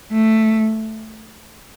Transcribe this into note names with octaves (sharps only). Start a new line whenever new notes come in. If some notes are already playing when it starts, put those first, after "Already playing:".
A3